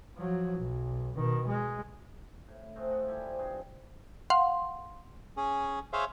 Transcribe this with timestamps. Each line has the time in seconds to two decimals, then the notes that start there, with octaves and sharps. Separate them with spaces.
0.17 F3 F#3
0.58 B1
1.16 B2 D#3
1.48 G#3
2.48 A2
2.76 F3 G#3 A3 C4
2.90 A4 D#5 F#5
3.07 G3 E4 G4 G#5
3.26 F3
3.39 G2 C3 C4 G#4
4.30 F5 F#5 C6
5.37 C#4 G#4
5.93 G#4 C5 C#5 E5 F5